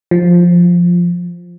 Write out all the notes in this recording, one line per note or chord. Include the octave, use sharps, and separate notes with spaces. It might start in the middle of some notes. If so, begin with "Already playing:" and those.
F3